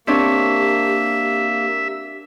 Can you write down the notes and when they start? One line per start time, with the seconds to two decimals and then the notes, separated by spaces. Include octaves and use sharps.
0.07 A#3 C4 D4 G4 C#5 E5